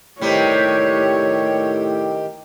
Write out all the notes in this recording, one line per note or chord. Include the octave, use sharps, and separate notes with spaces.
A2 C3 D#3 G3 G4 C#5